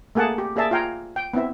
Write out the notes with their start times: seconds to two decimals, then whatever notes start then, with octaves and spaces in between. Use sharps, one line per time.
0.15 A3 A#3 G#4 F#5 A5
0.38 G4
0.56 A#3 G#4 D5 E5 A5
0.71 F4 F5 G5 G#5 A#5
1.16 G5
1.34 B3 C4 E4 E5